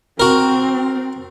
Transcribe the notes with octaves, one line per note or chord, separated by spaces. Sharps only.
C4 F#4 A#4